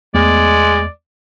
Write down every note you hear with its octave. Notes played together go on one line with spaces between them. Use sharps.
E2 G#3 A3 B3 D5